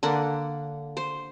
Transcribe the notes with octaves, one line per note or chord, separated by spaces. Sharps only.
D3 A#3 F#5
C5